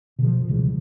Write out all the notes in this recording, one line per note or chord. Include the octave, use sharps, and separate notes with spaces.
B2 D3 E3 F3
C#2 C#3 E3 G3